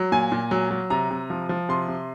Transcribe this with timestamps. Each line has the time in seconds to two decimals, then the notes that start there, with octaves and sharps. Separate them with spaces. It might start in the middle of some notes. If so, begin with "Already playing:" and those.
Already playing: F#3
0.12 A#2 G#5
0.32 A#2
0.51 F#3
0.71 F#3
0.90 C3 A#5
1.11 C3
1.30 F3
1.49 F3
1.69 C3 C6
1.88 C3